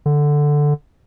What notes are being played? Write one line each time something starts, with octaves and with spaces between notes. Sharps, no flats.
D3